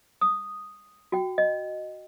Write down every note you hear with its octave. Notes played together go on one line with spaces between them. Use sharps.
D#6
F#4 G5
D#5